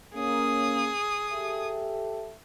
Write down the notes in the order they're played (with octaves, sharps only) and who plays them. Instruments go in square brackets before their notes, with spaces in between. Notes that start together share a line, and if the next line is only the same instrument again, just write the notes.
[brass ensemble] A#3 C#4 [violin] G#4 D#6
[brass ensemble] G4 A4 E5